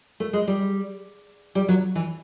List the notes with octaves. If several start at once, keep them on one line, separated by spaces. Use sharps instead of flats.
A3
G#3
G3
G3
F#3
E3